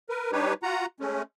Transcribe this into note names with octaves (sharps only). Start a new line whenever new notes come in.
A#4 B4
G3 D4 D#4 G4 B4 C#5
F4 F#4 F#5 A#5
G#3 A3 C#4